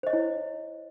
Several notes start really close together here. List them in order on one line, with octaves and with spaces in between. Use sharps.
C5 D#5 C#5 E4